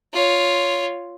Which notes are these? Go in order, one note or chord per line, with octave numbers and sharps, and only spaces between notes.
F4 C#5